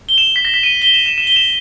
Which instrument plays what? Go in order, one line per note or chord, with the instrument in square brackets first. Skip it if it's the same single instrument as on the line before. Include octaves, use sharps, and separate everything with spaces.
[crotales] G7
E7
B6
A#6
B6
D#7
G7
E7
E7
E7
G7
E7